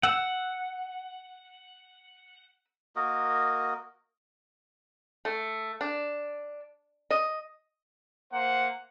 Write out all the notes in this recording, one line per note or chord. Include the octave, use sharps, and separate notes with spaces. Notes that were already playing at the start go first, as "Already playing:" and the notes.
F#5 E6
A#3 F#4 A#4 D#5
A3
D4
D#5
A#3 C5 F#5